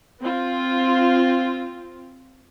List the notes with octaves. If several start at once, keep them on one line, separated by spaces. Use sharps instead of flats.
C4 F4